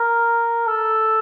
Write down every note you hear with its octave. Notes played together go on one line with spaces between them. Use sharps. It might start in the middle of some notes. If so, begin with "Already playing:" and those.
Already playing: A#4
A4